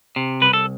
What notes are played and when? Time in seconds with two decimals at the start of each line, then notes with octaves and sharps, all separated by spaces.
0.16 C3
0.41 C2 B4
0.53 A4